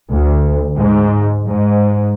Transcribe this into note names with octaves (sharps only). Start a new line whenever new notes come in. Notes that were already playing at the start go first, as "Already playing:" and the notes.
D2
G#2
G#2